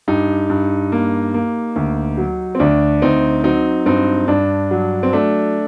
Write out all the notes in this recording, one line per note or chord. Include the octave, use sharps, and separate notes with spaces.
G2 D#4 G4
G2
A#3
A#3
D2
F#3
C4
D2 D4
D2 C4 D#4
F#3 C4 D#4
G2 C4 D#4
G2 D4
F#3
C4
A3 D4